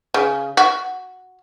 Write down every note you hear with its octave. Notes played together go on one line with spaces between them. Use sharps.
C#3
F#4